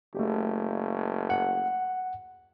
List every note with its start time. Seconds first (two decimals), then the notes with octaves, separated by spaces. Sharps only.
0.15 F#1 A3 G4
1.30 F#5